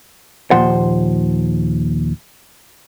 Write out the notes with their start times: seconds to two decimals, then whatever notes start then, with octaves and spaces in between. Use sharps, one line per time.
0.51 D#2 A#2 F3 C5 F#5